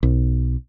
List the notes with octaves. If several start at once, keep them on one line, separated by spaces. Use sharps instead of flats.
B1